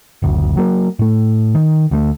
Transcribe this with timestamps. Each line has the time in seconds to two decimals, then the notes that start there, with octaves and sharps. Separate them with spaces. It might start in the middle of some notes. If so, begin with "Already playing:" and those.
0.22 F#1 D2
0.57 F#3 A#3
0.99 A2 A3
1.55 D#3
1.91 D2 G3 A3